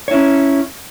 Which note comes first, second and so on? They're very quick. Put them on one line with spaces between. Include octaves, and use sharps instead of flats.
C#5 E4 C#4